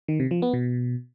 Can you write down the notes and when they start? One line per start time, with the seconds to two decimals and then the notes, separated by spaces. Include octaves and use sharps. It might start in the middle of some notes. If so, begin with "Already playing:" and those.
0.08 D#3
0.20 C3
0.31 F3
0.42 B3
0.54 B2